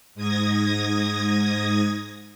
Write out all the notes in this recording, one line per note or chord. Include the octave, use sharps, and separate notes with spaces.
G#2 D#6 G#6 A#6